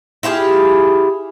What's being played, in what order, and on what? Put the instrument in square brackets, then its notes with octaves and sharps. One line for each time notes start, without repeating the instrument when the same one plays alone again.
[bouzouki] E4 F4 G4 G#4